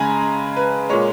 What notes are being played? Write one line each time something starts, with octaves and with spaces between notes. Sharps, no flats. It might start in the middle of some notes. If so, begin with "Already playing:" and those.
Already playing: C#3 G#3 G#5 A#5 B5
B4
A#2 G#3 C#5